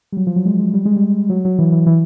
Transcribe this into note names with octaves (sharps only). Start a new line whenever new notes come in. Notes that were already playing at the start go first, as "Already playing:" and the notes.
G3
F#3
F3
F#3
G#3
G#3
G3
G#3
G3
F#3
F#3
E3
E3
E3